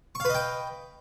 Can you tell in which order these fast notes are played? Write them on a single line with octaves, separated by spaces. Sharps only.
C#6 F5 B4 D#5 G5